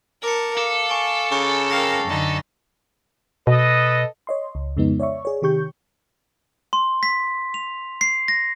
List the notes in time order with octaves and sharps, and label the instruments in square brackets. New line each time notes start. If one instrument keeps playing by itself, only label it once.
[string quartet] A#4 A5 [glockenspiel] D6 C#7
[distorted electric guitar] A4 [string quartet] F5 [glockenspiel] D6 C#7
[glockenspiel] G#5 C#6 D7
[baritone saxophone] C#3 [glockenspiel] C#6
[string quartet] A#4 F5 G5 [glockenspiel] A#6
[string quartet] F#2 D3 D#4
[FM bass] B2 [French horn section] A4 B4 D#5
[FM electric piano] C#5 D#5 C6
C#2
F2 C#3 G#3 B3 D#4
C#5 D5 E5 C#6
G#4 C#5
C3 D#3 G4 C#6 G6
[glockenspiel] C6
B6
F7
C7
A#6